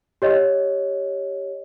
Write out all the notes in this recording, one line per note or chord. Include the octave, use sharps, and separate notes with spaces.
G4 C#5 D#5